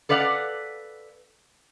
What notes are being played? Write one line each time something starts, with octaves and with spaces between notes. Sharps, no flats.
A4 B4 D5 F5 F#5